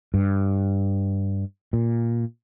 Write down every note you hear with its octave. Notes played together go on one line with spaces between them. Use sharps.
G2
A#2